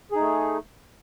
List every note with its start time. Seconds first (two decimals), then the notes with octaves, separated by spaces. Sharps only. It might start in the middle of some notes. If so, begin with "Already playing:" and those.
0.12 G#4
0.16 D#4
0.20 A3